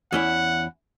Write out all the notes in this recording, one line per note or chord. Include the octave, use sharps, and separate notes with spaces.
E2 C#4 E4 F#5